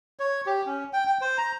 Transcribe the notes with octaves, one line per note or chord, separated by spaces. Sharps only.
C#5
G4
C#4
G5
G5
C5
A#5